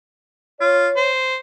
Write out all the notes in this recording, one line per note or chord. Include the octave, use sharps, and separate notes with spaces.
F4 C#5
C5